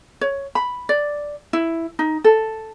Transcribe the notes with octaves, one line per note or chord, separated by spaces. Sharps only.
C#5
B5
D5
E4
D#4
A4